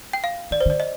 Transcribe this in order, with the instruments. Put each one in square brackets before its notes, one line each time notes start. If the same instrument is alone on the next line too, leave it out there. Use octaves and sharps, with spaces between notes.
[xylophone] G5
F5
[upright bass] D#3 [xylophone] D5
[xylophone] C5
[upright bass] D3
[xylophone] D5
D#5